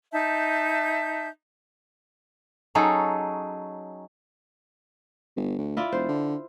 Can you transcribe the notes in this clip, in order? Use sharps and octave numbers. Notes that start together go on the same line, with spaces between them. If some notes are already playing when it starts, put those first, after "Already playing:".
D#4 E5 A5 G6
F#3 C#4 D#4 G#4 A4
G1
D2
E4 F4 D5
E1 C5
D3